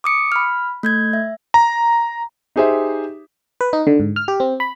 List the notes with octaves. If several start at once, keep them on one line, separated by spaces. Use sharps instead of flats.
D6 D#6 C#7 D7
B5 F6
A3 G6 G#6
E5
A#5
D#4 G4 G#4 C5 E5
B4
D#4
D3
G#2
F6
G4
C4
B5